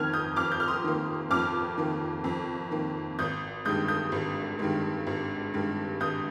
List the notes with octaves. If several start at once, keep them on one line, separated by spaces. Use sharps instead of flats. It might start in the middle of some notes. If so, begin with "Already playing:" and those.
Already playing: F2 D#3 A#3 F6 G#6
D#6 G6
F2 D6 F6
G6
F6
C6 D#6
D#3 A#3
F2 D6 F6
D#3 A#3
F2
D#3 A#3
G#1 D#6 G6
G2 D#3 G#3 D#6 G6
D#6 G6
G#1
G2 D#3 G#3
G#1
G2 D#3 G#3
G#1 D#6 G6